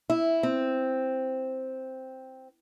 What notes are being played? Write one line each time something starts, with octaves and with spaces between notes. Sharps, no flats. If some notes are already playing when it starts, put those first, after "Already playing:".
E4
C4